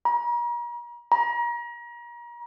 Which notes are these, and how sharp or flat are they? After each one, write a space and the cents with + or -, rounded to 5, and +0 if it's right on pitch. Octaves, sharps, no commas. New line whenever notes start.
A#5 +40
A#5 +35